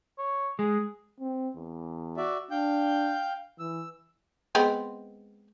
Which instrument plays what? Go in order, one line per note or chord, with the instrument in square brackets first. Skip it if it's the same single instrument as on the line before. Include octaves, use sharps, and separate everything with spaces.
[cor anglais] C#5
[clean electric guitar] G#3 [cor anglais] G#4
[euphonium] C4
E2
[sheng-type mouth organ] F#4 D5 E5
[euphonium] D4 [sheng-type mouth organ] F5 G5 G6
[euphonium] E3 [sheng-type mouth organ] E6
[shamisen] G#3 B3 C4